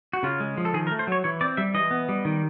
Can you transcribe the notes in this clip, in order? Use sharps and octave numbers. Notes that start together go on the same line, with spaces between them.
F#4
C#3 F4
G#3
F3
A4
D#3 G#4
A#4
A3
C5
F#3 C#5
E3 C#5
C4 D5
G3 E5
E3 D#5
B3
G3
D#3